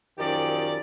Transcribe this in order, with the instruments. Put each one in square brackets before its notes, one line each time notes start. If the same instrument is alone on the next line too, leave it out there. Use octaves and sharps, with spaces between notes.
[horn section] F#2 D#3 F3 G4 D5